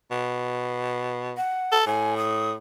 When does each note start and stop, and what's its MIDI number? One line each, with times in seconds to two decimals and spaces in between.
0.11 1.34 47
1.37 1.76 78
1.72 1.86 69
1.86 2.55 45
1.86 2.17 80
2.17 2.51 87